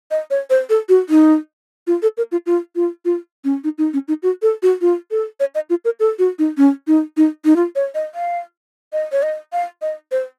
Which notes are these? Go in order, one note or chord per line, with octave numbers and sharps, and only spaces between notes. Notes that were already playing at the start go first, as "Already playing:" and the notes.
D#5
C#5
C5
A4
F#4
D#4
F4
A4
A#4
F4
F4
F4
F4
C#4
D#4
D#4
C#4
D#4
F#4
A4
F#4
F4
A4
C#5
D#5
F4
A#4
A4
F#4
D#4
C#4
D#4
D#4
D#4
F4
C#5
D#5
F5
D#5
C#5
D#5
F5
D#5
C5